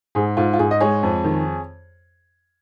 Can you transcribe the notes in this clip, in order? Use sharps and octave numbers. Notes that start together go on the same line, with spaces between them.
G#2 G#4
G#2 F4
F4
G#2 G#4
D#5
G#3 G#4 C#5
F2
D#3